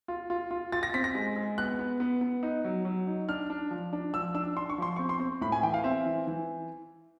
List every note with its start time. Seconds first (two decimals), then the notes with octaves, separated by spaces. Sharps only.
0.08 F4
0.30 F4
0.51 F4
0.72 F4 A6
0.83 A#6
0.94 C4 B6
1.04 A#6
1.15 G#3
1.36 G#3
1.58 B3 F#6
1.79 B3
2.00 B3
2.21 B3
2.43 D#4
2.65 F#3
2.85 F#3
3.07 D#4
3.29 D4 F6
3.50 D4
3.71 F3
3.93 D4
4.13 F3 E6
4.34 D4 E6
4.56 D4 C6
4.69 C#6
4.78 F3 C6
4.96 C4 C#6
5.09 C6
5.20 C4
5.41 A2 B5
5.52 G#5
5.63 E3 G5
5.74 F5
5.84 C4 E5
6.06 E3
6.27 E3